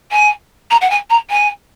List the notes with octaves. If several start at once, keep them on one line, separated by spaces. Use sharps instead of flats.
G#5
A#5
F#5
G#5
A#5
G#5